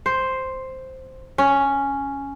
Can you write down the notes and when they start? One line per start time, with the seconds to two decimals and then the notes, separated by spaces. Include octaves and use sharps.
0.06 C5
1.38 C#4